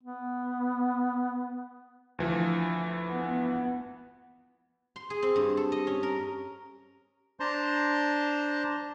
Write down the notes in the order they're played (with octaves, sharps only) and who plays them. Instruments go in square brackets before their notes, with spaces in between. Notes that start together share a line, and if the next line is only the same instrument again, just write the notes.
[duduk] B3
[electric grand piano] D2 E3 F3
[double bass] B3
[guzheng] C6
G#4
C4
G2
A4
D#5
C#4
A#4
[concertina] D4 C5 A5 A#5 C6